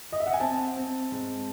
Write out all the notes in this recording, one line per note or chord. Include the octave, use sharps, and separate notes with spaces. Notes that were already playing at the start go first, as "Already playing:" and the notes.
D#5
E5
F#5
G#5
C4 A5
C4
G#2